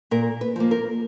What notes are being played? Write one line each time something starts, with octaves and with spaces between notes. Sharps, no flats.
A#2 A#4
B4
F3 A#3
A#4